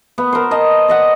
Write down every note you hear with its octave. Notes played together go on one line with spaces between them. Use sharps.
B3
A#4 C5
D#5 A5
D5 D#5 F#5